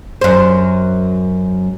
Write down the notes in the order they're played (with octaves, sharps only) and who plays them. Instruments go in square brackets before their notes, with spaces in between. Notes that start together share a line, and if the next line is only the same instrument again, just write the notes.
[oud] F#2 C5